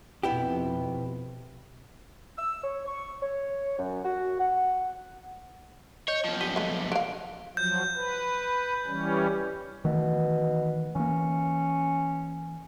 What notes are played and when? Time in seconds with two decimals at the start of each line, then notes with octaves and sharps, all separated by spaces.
0.23 F2 B2 B3 E4 G4
2.38 E6
2.64 C#5
2.86 C#6
3.22 C#5
3.79 F#2
4.05 F#4
4.40 F#5
6.08 C#5 D#5 G6
6.24 B1 F3
6.41 G3 B6 D#7 G7
6.56 G#3 A3
6.92 D3 F5 D7
7.57 F3 F#3 G6
7.95 B4
8.87 E3 G3 C#4
9.85 B2 D#3 E3 A3
10.96 E3 A#3 C#4